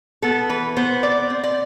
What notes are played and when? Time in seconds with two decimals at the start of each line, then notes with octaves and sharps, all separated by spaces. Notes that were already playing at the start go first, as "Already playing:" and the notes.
0.22 B3 A4
0.49 E3 B4
0.76 B3 C5
1.03 C4 D5
1.30 C4
1.44 D5